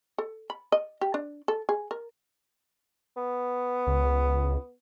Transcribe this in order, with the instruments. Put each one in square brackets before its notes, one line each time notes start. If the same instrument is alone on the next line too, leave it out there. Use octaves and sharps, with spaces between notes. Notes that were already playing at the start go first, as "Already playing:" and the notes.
[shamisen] A4
B5
D#5
G4
D4
A4
G#4
A#4
[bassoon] B3
[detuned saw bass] C#2